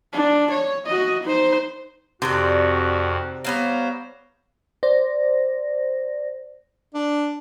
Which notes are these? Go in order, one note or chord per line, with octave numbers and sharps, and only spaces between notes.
D4
C#5
F#4 D#5
D#4 C5
F2 C3 D#3 F#4 G4 D5
G3 B3 C5 C#5 F5 A#5
C5 D5 A#6
D4